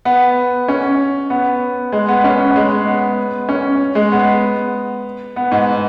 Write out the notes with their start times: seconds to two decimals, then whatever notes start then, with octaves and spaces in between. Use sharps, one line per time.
0.05 B3
0.68 C#4
1.30 B3
1.92 G#3
2.08 B3
2.24 C#4
2.40 B3
2.56 G#3
2.87 B3
3.49 C#4
3.95 G#3
4.12 B3
5.36 B3
5.51 G#2